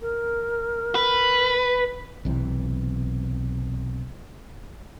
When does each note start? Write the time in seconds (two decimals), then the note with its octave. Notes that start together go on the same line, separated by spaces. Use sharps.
0.01 A#4
0.95 B4
2.25 B1 C3 E3